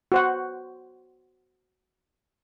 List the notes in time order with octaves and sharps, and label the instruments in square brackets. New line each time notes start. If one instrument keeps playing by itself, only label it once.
[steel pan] F#4 C5 F#5